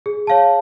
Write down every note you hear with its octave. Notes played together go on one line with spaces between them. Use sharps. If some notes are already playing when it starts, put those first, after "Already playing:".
G#4
C#5 F5 A5